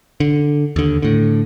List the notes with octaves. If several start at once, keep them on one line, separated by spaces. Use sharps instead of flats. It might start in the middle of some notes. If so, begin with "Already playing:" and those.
D3
D#2 D3
A2 D3